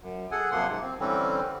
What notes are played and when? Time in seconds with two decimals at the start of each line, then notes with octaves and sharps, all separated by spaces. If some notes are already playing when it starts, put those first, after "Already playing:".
0.02 F#2
0.31 G#4 A4 F#5 G#5
0.51 F#2 C3 F3 A#3 F#5 C6
0.68 G#2
0.82 C4
1.00 D3 E3 G3 C4 C#4